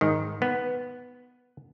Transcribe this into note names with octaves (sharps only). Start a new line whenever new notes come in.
G#2 D#3
B3